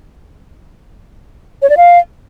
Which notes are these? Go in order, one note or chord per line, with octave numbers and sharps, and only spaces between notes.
C#5
D5
F5